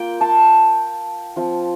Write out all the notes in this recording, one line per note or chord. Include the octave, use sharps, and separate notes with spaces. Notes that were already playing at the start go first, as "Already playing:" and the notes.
Already playing: A#3 F4 G5
A5
F3 C4 F4